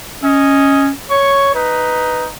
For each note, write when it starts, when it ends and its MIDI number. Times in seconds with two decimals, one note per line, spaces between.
0.23 0.90 61
0.23 0.88 75
1.10 1.51 73
1.10 1.52 85
1.55 2.30 63
1.55 2.26 71